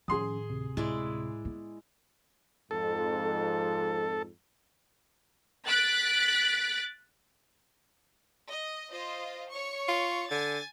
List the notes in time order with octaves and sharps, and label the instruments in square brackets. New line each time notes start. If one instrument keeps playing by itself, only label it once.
[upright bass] A2 D#3 [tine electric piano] F3 C#4 [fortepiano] G#4 C6 D#6
[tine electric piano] D2 C3 C4
[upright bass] A2 [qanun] G#3 E4 D5
[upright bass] B3
[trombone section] F2 G#2 [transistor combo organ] A4
[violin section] F#6 A6 B6 D7
D#5
F4 C5 D#5
C#5 C#6
[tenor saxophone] F4
[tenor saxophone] D3 [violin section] G#5 G#6 A6